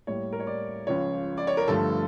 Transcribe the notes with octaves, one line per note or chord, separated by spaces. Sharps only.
A2 G3 A#3 C#5
A#4
C#5
D5
C#2 C#3 F3 C#5
D5
C#5
A#4
G2 D3 F3 A3 A4